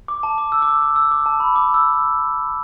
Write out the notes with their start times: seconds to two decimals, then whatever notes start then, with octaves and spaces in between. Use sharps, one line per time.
0.08 D6
0.23 A5
0.38 D6
0.52 E6
0.62 D6
0.67 E6
0.82 D6
0.96 E6
1.11 D6
1.26 A5
1.40 B5
1.56 D6
1.74 E6